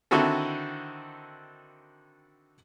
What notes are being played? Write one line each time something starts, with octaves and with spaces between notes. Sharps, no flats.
D3 D#3 C4 E4 F#4 A4